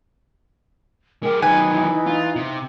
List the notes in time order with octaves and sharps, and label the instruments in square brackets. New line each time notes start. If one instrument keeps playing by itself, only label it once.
[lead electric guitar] G#3 G4 [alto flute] A#4
[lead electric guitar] D#3 F#3 [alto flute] D#4 [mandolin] B4 G#5
[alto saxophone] E3
[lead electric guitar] F4
C3